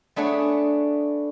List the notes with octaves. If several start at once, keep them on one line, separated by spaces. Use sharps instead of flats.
A3 B3 D4 G#4 C#5